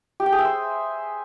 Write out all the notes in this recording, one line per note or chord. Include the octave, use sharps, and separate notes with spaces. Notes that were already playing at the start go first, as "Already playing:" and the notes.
G4
G5
G#4
E5
C5